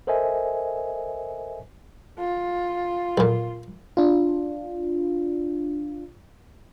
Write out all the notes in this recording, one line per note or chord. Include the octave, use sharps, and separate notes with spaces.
A4 A#4 C5 D#5 E5 G#5
F4
B1 A#2
D4 F4